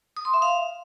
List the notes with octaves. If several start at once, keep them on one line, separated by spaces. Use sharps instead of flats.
D#6
C6
E5
F5